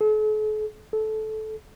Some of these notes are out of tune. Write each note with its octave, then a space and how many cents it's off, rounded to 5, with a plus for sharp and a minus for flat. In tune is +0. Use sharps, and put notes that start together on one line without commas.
A4 -45
A4 -15